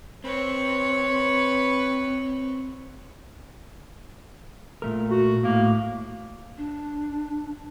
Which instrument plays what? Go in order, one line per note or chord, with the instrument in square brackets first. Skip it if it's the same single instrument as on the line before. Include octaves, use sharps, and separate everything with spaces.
[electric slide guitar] C4 [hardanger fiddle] B4 C#5
[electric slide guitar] A#2 A3 A#4
[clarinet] F#4
[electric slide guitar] A2 [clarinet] A#3
[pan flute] D4